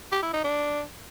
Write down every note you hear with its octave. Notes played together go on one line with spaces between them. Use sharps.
G4
E4
D#4
D4